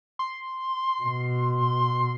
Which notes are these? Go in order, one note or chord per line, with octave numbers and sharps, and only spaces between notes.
C6
B2